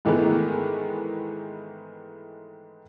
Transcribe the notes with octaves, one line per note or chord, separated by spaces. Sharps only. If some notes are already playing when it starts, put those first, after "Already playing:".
G#2 D#3 E3 G#3 A3 B3